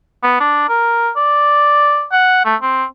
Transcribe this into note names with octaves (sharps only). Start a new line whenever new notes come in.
B3
D4
A#4
D5
F#5
A3
C4